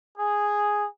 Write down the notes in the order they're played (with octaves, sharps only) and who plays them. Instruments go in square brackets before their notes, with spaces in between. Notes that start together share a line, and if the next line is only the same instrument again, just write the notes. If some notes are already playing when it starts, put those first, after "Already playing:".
[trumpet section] G#4